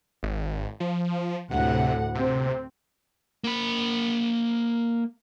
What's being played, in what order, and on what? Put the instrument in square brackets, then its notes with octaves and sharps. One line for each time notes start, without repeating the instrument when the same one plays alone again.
[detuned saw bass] G#1
F3
[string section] D2 A2 F#5 [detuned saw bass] C3
[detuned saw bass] C3 [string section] C4
[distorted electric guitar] A#3 B5